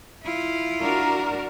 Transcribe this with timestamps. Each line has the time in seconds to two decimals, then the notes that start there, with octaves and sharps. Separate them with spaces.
0.23 E4 F4
0.81 D4 F#4 A#4